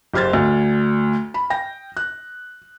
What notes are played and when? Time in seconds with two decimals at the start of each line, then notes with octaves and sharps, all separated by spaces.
0.14 F#1 G4 C5 F6 G#6 A6
0.33 D2
1.34 B5
1.50 G5 A#6
1.97 F#6